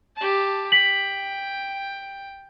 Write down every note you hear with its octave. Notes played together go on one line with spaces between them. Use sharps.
G4 A5
G5 B6 F#7